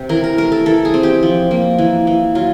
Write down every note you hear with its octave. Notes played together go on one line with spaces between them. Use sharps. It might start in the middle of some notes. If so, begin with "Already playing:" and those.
Already playing: C3 G4
E3 A#4
A#4
A3 A#4
A4
E3 A4
G#4
C4
G4
F3
A#3
E3
E3
F#3 F4